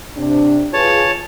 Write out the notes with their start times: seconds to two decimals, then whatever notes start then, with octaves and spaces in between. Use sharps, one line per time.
0.17 C3 D4
0.73 F4 G#4 B4 C#5 A5